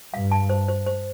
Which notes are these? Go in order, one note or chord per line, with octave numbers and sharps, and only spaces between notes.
G2 F5
A5
C5
C5
C5